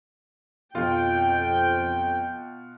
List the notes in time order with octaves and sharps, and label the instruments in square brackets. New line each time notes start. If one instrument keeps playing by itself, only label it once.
[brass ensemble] F2 [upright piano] B2 F4 [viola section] G5